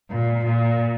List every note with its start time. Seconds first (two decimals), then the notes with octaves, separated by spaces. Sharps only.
0.11 A#2
0.45 A#2